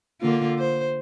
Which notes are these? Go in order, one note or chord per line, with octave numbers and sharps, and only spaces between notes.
D3 A#3 F4
C5